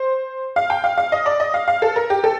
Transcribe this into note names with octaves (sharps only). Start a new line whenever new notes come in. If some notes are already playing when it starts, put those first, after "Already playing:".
Already playing: C5
F5
G5
F5
F5
D#5
D5
D#5
F5
F5
A4
A#4
G4
A4